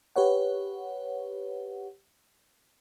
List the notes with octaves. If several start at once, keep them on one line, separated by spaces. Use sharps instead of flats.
G4 B4 C#5 F#5